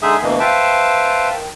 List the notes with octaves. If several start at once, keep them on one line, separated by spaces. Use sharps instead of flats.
D3 G#3 D#4 G#4 E5 D#6
D2 B2 E3 A#3
B4 C5 E5 F5 G5 A5
D#3